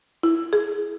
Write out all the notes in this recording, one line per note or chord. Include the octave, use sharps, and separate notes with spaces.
E4
G#4